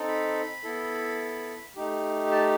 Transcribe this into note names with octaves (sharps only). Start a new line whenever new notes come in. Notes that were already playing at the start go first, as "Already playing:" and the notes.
Already playing: C4 D#4 A4
B5
B3 E4 A4
A3 D#4 G4
A5